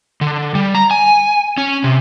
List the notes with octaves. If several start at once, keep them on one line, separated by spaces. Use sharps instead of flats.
D3
G3
A#5
G#5
C#4
C3